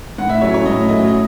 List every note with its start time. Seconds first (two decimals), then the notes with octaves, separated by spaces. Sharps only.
0.18 A2 F#5
0.30 E5
0.41 F#3 A3 C#4 E4 C#5
0.54 C#5
0.66 A2 D#5
0.89 F#3 A3 C#4 E4 D#5
1.08 D#5